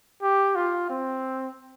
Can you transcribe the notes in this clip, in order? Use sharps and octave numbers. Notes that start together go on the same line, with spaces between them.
G4
F4
C4